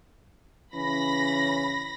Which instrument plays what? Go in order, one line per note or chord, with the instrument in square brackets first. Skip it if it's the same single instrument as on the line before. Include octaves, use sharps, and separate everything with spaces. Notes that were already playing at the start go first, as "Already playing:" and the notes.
[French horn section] C#3 E3 C#4 [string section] B5 A#6